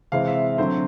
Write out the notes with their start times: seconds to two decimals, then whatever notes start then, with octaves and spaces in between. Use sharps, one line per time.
0.12 C3 E3 G#3 C4 F5
0.27 E5
0.58 D3 F#3 A3 C4 C5